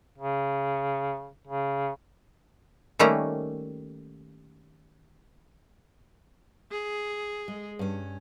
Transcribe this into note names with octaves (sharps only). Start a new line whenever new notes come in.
C#3
C#3
D#3 G3 A3 A#3 C#4 A#5
G#4
G#3
G2 C#4